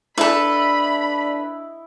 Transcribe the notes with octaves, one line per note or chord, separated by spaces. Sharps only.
D4 E4 A4 B4 D#5 B5